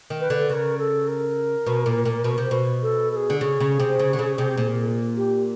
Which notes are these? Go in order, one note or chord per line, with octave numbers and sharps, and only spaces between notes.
D#3
B4
D3
C#3 A#4 B4
A4
A#4
B2
A#2
A#2
B2
C3
B2
A4
A4
G#4
D3
C#3 G#4
C#3
C3
C#3
D3
C#3
C3
A#2
G4